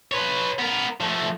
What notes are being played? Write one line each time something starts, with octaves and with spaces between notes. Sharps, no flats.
B4 C#5
B3 A#4
F3 A3